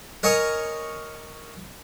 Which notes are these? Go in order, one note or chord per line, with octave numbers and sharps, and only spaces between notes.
A#4 C#5 D#5 G#5 C#6 D#6